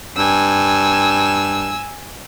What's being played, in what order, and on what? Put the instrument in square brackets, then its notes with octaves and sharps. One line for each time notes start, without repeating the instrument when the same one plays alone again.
[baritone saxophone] G2 [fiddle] G#5 E6